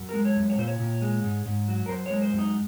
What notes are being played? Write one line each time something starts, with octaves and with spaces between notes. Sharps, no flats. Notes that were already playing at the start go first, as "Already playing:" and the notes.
Already playing: F#2
G#3 A#4
C#5
F#2
C#5
A#2 C5
C#5
A#2
G#3
G#2
G#2
F#3
A#4
F#2 C5
G#3 C#5
C5
F#2
D#4